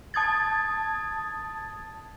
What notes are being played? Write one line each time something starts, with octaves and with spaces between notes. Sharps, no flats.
A5 D#6 G#6 A6